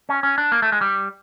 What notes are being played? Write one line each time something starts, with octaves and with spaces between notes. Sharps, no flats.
C#4
C#4
D4
A#3
A3
G#3
G3